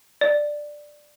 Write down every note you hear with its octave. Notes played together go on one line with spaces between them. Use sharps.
D5